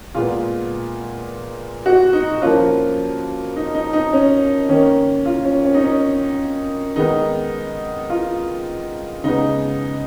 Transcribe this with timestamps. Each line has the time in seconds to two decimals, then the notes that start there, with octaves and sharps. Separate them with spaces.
0.15 A#2 G#3 B3 F4
1.86 F#4
2.13 D#4
2.42 F3 A#3 C#4 F4
3.56 D#4
3.75 D#4
3.93 D#4
4.13 C#4
4.69 D#3 A#3 C#4
5.25 F4
5.45 C#4
5.64 C#4
5.74 D#4
5.83 C#4
6.96 D#3 G#3 B3 D#4
8.10 F4
9.23 C#3 G#3 B3 D#4